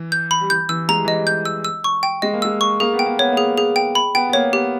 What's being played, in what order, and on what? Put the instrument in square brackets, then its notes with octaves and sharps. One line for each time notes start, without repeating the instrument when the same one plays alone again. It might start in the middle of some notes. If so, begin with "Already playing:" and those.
Already playing: [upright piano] E3
[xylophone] G6
B5
[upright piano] G3
[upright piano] E3 [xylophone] G6
[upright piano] E3 [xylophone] E6
[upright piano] G#3 [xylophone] A#5
[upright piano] G3
E3
[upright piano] G3 [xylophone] D#5
[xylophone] G6
E6
E6
C#6
G5
[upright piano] G#3 [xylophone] D#5
[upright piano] A#3
[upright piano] G#3 [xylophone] E6
[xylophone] C#6
[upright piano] A#3 [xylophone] G#4
[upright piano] B3
[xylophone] G5
[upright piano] A#3
[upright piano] B3 [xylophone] C#5
[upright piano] A#3
[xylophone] G#4
G#4
G5
B5
[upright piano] B3 [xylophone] G5
[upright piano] B3
[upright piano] A#3 [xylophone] C#5
[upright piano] B3 [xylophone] G4